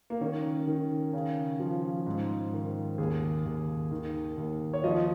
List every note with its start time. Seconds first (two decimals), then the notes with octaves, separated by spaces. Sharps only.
0.10 A#3
0.21 D#3 C#4
0.67 D#3
1.13 C#3
1.60 F3
2.07 G#2
2.53 D#3
2.98 D#2 G#4
3.45 D#2
3.91 D#3
4.37 D#2
4.74 C#5
4.84 F3 D#5